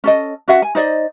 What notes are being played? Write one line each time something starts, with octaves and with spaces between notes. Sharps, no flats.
C#4 A4 D#5
C#4 F#4 E5 F#5
G#5
D#4 C5 D5 D#5